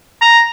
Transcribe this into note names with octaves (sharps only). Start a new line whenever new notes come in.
A#5